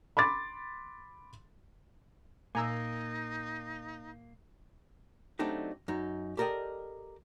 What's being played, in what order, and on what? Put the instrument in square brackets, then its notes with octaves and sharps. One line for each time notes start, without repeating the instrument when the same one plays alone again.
[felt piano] B5 C6 D6 A6
[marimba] A#2 [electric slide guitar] A#3 [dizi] D#4 [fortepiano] G#5 A#5 E6
[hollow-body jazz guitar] F#3 A3 C4 D4 D#4 G4
F#2 D#4
G4 A4 A#4 D5 D#5 G5